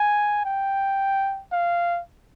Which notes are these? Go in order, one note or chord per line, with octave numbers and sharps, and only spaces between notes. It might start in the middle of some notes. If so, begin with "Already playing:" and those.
Already playing: G#5
G5
F5